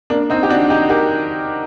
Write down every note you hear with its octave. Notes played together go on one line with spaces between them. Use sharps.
A#3 D4
C4 D#4
G4
D4 F#4
D#4 G4
G4 A#4